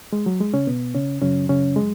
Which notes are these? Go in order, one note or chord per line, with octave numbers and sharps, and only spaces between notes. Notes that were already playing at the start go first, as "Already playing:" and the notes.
G#3
F#3
G#3
C#3 C#4
B2 B3
C#3 C#4
F#2 C#3 F#3 C#4
C#3 C#4
G#3